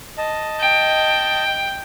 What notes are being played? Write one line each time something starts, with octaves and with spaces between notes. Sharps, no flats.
D#5 A5
G5